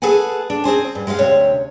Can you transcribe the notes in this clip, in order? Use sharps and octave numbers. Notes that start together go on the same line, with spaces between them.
G#4 A4 B4 F#5 G#5
D4
C4 G#4 C5 G#5
G2
G#3 F4 B4 F5 F#5
D2 C3 C#5